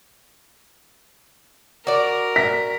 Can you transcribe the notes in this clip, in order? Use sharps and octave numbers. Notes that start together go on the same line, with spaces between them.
F#4 A#4 D5
B6